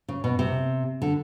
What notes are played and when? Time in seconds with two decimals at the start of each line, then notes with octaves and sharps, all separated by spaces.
0.08 C#3
0.24 B2
0.39 C3
1.02 D3